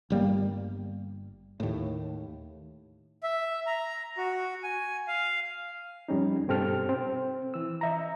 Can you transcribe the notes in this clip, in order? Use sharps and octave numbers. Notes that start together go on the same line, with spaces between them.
G1 G3 A#3
D#2 A2
E5
A#5
F#4
G#5
F5
F2 G3 C#4 D#4
G2 B2 C4 G4 A4 F6
C4
E3 E6
D#5 E5 A#5